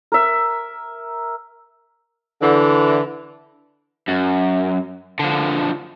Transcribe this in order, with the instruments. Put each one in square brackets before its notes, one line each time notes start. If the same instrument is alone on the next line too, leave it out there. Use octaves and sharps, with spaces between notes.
[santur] A#4 E5
[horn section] D3 E3
[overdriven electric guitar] F#2
D3 F3